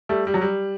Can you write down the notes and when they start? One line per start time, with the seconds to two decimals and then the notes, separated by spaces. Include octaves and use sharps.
0.09 G3 A3
0.27 G3
0.34 F#3
0.41 G3